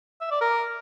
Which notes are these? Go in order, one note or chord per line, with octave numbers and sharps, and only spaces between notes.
E5
D5
A#4